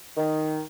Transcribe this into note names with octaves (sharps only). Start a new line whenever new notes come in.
D#3